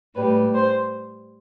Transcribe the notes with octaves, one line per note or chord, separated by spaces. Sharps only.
A2 G3 B4
C5